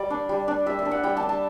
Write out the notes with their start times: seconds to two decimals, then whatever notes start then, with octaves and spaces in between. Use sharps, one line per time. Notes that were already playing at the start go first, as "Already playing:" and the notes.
Already playing: G3 D5
0.10 D4
0.29 G3
0.48 D4
0.66 G3 E5
0.79 E5
0.85 D4
0.91 F#5
1.03 G3 G5
1.17 A5
1.23 D4
1.29 A5